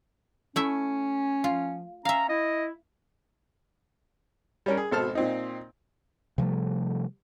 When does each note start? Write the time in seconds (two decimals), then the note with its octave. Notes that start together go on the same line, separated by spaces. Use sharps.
0.56 A3 C#4 E4 E5
1.44 F3 F4
2.05 C#4 E5 F5 A#5
2.29 E4 D#5
4.66 G3 C#4 A#4
4.77 G#4
4.91 G#1 B2 A4 C5 A5 F6
5.15 A#2 C4 D#4
6.38 C3 F3 G3 A3